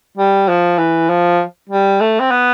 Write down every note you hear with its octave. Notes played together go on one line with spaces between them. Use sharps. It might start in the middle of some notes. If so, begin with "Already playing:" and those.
G3
F3
E3
F3
G3
A3
C4
B3